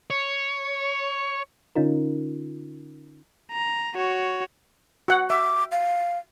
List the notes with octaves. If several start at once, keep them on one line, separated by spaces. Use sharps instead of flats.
C#5
D3 C#4 D#4 F4 A#4
A#5
F#4 C#5
F#4 F#5
E5 D6
F5